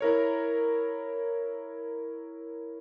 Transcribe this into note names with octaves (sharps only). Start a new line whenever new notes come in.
E4 A#4 C#5